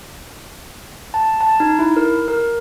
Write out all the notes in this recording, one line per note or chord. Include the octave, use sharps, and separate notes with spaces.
A5
A5
D#4
E4
A#4
A#4